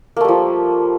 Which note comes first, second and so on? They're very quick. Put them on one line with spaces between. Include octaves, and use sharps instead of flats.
A#3 A3 G3 F3